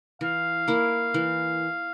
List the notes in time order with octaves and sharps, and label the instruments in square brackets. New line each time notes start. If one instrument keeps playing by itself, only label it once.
[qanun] E3 [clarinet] F5
[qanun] A#3 E4
E3